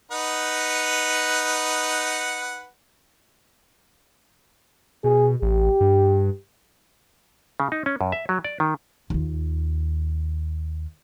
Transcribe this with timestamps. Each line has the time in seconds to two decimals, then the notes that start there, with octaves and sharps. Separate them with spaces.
0.11 D#4 B4 F#5
5.04 B2 G#4
5.42 A1 G4
5.81 G2
7.60 C#3
7.72 D#4
7.86 C#4
8.01 F#2
8.12 E5
8.29 F#3
8.45 D5
8.60 D#3
9.10 D#2 F4